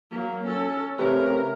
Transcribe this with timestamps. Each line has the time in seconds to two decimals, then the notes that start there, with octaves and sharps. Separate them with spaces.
0.11 F#3 A#3
0.46 C#4 A4
0.99 C#3 A3 C4 G4 A#4 B4 C#5